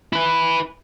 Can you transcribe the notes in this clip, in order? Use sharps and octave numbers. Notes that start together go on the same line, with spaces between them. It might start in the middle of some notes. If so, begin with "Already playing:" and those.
E4 B4